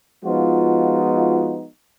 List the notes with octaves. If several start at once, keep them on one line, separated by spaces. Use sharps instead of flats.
F3 G#3 B3 D#4 F4 F#4